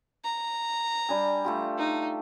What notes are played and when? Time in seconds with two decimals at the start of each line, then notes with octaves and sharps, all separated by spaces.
0.24 A#5
1.09 G3 D4 G#5
1.45 A3 F4 G4
1.77 D#4